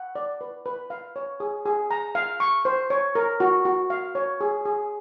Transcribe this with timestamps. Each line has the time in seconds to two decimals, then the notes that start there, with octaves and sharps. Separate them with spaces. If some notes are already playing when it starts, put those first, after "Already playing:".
Already playing: F#5
0.15 D5
0.41 B4
0.66 B4
0.90 F5
1.16 C#5
1.40 G#4
1.66 G#4
1.91 A#5
2.15 F5
2.40 C#6
2.65 C5
2.90 C#5
3.15 A#4
3.40 F#4
3.65 F#4
3.90 F5
4.15 C#5
4.41 G#4
4.65 G#4